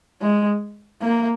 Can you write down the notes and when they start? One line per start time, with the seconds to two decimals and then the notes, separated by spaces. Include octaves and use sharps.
0.22 G#3
1.02 A#3